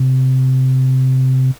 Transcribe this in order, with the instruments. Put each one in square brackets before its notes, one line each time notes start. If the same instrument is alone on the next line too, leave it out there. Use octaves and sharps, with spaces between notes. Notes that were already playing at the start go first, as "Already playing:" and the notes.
Already playing: [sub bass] C3